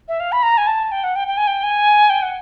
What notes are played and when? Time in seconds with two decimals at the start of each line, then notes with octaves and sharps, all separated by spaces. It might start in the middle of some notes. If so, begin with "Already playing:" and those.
0.08 E5
0.20 F5
0.32 B5
0.43 A#5
0.58 G#5
0.67 A5
0.92 G5
1.04 F#5
1.16 G5
1.28 G5
1.38 G#5
1.47 G5
1.63 G#5
2.10 G5
2.22 F#5